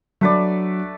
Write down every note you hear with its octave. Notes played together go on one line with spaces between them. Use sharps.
F#3 A3 D4 B4 D5